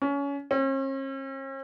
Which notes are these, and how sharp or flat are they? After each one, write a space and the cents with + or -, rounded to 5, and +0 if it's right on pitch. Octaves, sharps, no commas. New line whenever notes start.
C#4 +25
C#4 -45